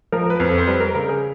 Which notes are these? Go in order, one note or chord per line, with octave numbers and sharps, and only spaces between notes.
F3 A#4
B4
F2
A4
C5
G3 B4
A#4
C#3 A#4
G#4